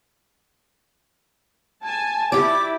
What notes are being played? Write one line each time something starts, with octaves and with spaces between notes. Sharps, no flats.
G#5 A5
E4 G4 D5 D6